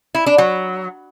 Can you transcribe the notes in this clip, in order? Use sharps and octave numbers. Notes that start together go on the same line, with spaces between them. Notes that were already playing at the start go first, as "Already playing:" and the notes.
E4
D4
F#3